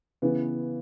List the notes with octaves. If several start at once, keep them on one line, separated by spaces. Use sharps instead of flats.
C#3 E3 B3